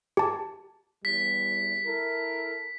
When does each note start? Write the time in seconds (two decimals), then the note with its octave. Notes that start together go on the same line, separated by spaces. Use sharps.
0.17 G4 A5
1.05 E2 G3 B6
1.85 E4 A4 A#4